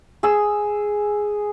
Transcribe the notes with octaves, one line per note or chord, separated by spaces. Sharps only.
G#4 E6